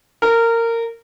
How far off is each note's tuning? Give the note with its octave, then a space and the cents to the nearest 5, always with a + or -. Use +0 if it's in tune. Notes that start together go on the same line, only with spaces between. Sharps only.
A#4 -20